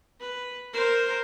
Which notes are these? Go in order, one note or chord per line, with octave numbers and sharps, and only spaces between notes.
B4
A#4 C5